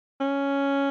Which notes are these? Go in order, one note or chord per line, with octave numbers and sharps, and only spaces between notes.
C#4